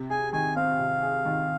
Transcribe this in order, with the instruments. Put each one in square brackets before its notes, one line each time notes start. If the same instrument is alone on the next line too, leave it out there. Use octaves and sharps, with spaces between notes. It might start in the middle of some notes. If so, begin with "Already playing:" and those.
Already playing: [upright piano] C3
[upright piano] G#4 [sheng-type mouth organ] G#5
[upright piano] D#3 [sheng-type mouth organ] G#5
[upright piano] C4 [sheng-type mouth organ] F5
[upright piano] C3
G#4
D#3